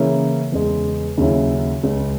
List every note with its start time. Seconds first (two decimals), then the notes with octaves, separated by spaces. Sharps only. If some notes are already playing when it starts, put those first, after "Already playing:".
Already playing: C#3 E3 A#3 C#4 E4
0.52 E2 C#3 G#3
1.17 D#2 C#3 F#3 C#4 E4
1.83 C#2 C#3 G#3